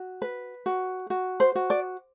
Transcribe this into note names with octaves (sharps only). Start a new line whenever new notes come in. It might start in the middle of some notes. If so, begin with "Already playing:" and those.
Already playing: F#4
B4
F#4
F#4
C5
F#4
D5